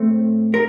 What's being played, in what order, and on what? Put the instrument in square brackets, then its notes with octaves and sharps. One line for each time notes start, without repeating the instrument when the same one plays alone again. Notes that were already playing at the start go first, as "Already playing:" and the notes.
Already playing: [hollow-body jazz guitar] A2 A3 C4
A#4